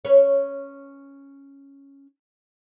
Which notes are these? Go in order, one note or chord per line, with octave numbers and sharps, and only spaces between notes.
C#4 B4 C#5